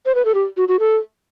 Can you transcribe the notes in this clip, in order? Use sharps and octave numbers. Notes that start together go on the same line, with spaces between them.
C5
B4
A4
G4
F#4
F#4
A4